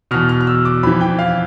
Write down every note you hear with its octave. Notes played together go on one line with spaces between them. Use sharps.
E2 B2 F6
F6
F6
E6
D6
F2 E3 B5
G5
F5